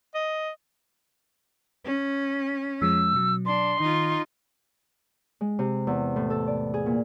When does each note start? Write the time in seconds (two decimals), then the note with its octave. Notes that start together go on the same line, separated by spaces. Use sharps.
0.14 D#5
1.84 C#4
2.81 F2 F3 G#3 E6
3.13 B2 F#3
3.46 D4 C6
3.80 D#3 D#4 F4
5.41 G#3
5.59 C3
5.87 E2
6.16 A2
6.30 A4
6.47 D5
6.74 G#4
6.86 A#2